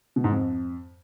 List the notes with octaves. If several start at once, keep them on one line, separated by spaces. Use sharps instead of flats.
B2
G#2
F2